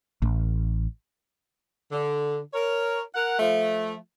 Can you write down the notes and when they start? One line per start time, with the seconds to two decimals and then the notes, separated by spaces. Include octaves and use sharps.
0.22 A1
1.92 D3
2.54 A#4 C#5
3.14 A#4 F#5
3.40 F3 A3